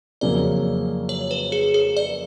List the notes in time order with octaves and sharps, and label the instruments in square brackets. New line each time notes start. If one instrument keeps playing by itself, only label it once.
[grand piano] F2 C#3 F#3 A#3 [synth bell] D5
[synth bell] C#5
B4
G#4
G#4
D5